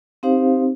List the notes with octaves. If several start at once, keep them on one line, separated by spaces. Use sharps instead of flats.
C4 D#4 G4 C5 F5